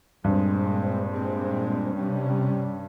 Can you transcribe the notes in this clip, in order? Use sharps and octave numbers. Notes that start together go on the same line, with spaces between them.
G2 A#2 G#3 C4
A#2 G#3 C4
C3 G3 C#4